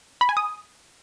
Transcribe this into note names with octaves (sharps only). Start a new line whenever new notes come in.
B5
G#5
D#6